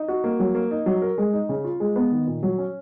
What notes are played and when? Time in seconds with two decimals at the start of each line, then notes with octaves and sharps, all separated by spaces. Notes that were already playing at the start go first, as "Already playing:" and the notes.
Already playing: D#4
0.08 F#4
0.24 A#3
0.40 F#3
0.55 A#3
0.71 D#4
0.86 F#3
1.02 A#4
1.18 G#3
1.33 D#4
1.49 C#3
1.64 F4
1.80 G#3
1.96 B3
2.12 D#3
2.27 A#2
2.43 F#3
2.58 C#4